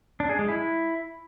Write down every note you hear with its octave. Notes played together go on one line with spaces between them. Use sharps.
D4
G#4
G#3
E4